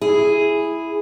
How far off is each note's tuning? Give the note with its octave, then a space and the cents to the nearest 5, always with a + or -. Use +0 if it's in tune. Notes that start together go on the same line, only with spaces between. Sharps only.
E4 +0 G#4 +0